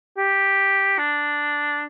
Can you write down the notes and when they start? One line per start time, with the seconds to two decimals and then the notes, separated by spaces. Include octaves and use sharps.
0.17 G4
0.98 D4